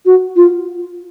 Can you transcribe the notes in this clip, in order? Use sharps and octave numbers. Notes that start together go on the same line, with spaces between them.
F#4
F4